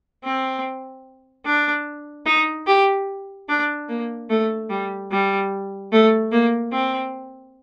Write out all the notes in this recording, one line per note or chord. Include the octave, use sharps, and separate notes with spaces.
C4
D4
D#4
G4
D4
A#3
A3
G3
G3
A3
A#3
C4